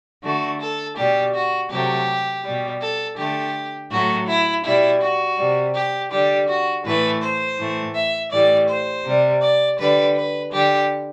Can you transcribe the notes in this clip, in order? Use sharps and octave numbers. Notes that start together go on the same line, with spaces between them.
D3 A3 F#4
A4
B2 G3 G4
F#4
C3 F#3 A3 G4
B2 G3
A4
D3 A3 G4
A2 F#3 A3 F#4
E4
B2 G3 E4
F#4
C3 G3
G4
D3 G3 G4
F#4
A2 E3 A3 B4
C5
A2 E3 A3
E5
A2 E3 G3 D5
C5
C3 G3
D5
D3 G3 B4
B4
D3 G3 G4